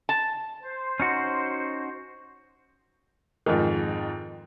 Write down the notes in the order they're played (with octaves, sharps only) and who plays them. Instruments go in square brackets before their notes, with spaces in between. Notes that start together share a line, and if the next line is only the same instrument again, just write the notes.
[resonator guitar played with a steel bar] A5
[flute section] C5
[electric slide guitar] C#4 D#4 F#4
[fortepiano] F2 G#2 D#3